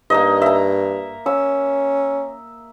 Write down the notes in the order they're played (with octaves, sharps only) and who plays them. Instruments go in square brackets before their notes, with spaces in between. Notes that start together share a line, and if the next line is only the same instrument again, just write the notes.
[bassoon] G2 [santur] A#3 D#4 D#5
[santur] E5 A#5
[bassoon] C#4 [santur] E6